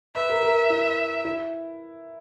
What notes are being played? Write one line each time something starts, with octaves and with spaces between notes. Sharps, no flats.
B4 E5
A#4
A#4
E4
E4